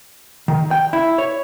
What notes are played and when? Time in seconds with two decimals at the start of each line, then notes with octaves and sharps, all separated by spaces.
0.48 D#3
0.71 G5
0.93 E4
1.18 C#5